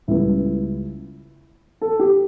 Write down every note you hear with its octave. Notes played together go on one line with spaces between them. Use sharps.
C#2 C#3 G3 B3 E4
A4
G4